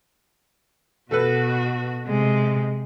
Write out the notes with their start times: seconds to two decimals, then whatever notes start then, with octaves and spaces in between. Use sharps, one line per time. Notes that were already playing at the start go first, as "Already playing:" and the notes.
1.11 B2 A3 F#4 A4 B4
2.07 C3 G#3